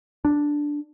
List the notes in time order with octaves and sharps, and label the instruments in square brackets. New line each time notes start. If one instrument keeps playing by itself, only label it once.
[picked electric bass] D4